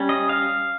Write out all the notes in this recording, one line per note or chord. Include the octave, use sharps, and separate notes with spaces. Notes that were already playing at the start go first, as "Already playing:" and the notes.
Already playing: G3 C#4
D#5
F5